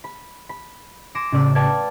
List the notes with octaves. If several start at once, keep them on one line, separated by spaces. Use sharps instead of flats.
B5
B5
G#5 C6 D6 A#6 C#7 E7
A1 C#3 D5 E6 B6
B4 D5 F5 G5 A5 G#6